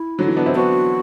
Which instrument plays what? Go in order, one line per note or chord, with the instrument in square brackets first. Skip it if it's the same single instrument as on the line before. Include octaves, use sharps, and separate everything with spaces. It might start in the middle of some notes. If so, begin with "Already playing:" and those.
Already playing: [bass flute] E4
[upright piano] D3 F#3
E3
B3 D4
C4 E4
[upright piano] B3 D4 [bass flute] F#4